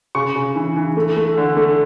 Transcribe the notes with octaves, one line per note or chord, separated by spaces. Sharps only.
C#3 C#6
C#3
E3
E3
A3
A3
D3
A3